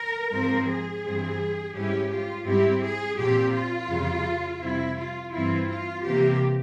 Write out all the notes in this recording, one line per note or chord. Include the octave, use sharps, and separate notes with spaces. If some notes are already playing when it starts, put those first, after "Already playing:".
Already playing: A#4
G#2 F3 C4 A#4
G#4
G2 E3 G3 C4
G#2 G3 C#4 E4 G4
F4
G#2 G3 C4 E4 G4
G#4
A#2 F3 C4 G4
F4
F2 C#3 G3
F2 C3 G3 C4 E4
F4
G2 E3 G3 C4 E4 F4
F4
C3 E3 A#3 G4